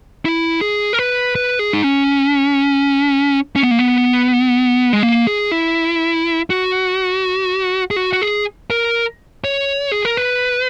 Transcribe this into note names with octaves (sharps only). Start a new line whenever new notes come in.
E4
G#4
A#4
B4
B4
G#4
D#4
C#4
C#4
B3
A#3
B3
G#3
A#3
G#4
E4
F#4
G#4
F#4
F#4
G#4
A#4
C#5
G#4
A#4
B4